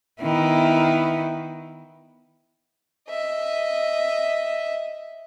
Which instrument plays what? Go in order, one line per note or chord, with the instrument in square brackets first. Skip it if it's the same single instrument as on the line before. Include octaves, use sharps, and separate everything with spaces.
[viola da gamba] D#3 B3 E4
[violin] D#5 E5